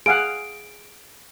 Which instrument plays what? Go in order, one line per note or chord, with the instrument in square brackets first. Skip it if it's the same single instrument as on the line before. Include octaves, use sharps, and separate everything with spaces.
[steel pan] G#4 F5 F#5 [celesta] D7